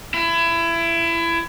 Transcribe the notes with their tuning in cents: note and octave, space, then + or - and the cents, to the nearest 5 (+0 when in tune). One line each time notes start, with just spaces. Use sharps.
E4 +25